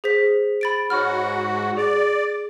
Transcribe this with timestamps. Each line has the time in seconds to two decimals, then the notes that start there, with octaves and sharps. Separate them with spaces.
0.04 G#4 C5 B6
0.61 B5 A6 D7
0.90 G#2 F#4 C#5 B5 F6
1.77 G#4 D5